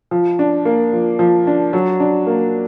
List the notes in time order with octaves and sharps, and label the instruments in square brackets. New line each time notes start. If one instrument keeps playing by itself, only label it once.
[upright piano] F3
D4
A#3
F3
F3
D4
F#3
D4
A#3